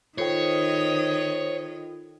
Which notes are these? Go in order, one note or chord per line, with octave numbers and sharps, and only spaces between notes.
D#3 F4 A4 C5 C#5 D#5 G5